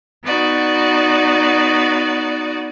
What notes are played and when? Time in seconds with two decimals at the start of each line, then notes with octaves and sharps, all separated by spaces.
0.24 B3 D#4 F#4 D5